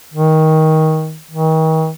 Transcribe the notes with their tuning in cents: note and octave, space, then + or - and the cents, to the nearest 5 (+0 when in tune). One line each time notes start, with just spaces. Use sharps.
D#3 +20
D#3 +40